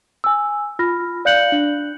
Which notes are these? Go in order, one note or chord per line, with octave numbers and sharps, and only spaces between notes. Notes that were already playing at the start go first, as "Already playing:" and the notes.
G#5 E6
F4 B5 F6 A#6
D5 F5 F#6 G6 C#7 F#7
D4